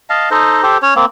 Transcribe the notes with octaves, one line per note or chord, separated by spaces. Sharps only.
D#5 F5 A5
D#4 A4 C5 D#5
G4 A4 C5
C#4 C#5
A#3 C4